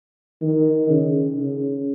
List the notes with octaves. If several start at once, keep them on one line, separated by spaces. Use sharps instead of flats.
D#3
C#3
C#3